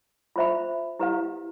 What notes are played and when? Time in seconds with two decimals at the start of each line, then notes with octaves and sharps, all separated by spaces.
0.36 F4 C5 E5 B5
0.99 E4 G4 B4 F5